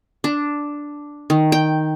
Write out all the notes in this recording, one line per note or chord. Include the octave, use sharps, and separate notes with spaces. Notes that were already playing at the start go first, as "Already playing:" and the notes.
D4
D#3
G5